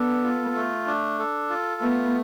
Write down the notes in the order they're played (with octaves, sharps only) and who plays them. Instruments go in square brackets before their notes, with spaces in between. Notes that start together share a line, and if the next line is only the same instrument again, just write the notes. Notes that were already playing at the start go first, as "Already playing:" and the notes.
Already playing: [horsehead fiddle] B3 [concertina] D4 A4
[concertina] F4
A3
D4
A4
F4
[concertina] A3 [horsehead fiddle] B3